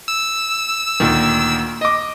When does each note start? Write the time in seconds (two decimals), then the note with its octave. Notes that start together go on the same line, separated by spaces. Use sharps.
0.08 E6
1.00 D2 A#2 D#3
1.81 D#5 D6